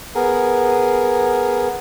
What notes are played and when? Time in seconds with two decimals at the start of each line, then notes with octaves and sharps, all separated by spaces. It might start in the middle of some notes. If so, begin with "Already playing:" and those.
0.15 B3 G#4 A#4